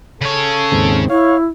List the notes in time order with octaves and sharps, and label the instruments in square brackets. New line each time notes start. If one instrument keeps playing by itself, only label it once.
[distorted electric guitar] C#3 C#5 [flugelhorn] A4
[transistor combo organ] D#2 G#2 C4
[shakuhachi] E4 [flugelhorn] C#5 [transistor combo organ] F5